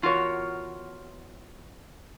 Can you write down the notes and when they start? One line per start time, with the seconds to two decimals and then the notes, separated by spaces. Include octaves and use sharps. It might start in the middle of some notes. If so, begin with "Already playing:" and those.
0.02 E2 F4 F#4 A#4 C#5